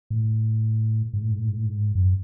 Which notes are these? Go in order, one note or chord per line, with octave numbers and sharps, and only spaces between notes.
A2
G#2
A2
G#2
A2
G#2
A2
G#2
F#2